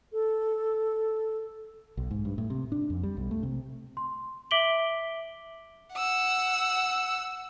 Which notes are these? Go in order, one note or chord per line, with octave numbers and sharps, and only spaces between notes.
A4
B1
G#2
G2
A2
C3
D4
F2
G3
B1
A3
C3
C6
E5 D6 B6 D7 F#7 G7
F#5 E6